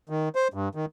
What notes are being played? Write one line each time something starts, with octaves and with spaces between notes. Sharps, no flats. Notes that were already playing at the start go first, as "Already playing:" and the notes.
D#3
C5
G2
D#3